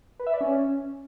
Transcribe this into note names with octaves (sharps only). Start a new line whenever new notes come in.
B4
E5
D5
C#4